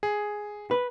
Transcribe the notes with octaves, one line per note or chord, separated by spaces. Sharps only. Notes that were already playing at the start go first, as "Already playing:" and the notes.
G#4
B4